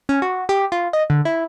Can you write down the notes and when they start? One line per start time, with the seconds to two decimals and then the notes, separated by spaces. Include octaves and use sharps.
0.09 C#4
0.22 F#4
0.49 G4
0.72 F4
0.93 D#5
1.10 D3
1.25 E4